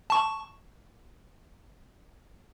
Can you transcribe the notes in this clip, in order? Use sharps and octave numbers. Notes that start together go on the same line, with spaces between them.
A5 C#6